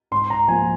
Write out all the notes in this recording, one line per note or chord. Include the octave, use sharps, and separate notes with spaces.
G#2 C6
A#5
F3 A#3 G#5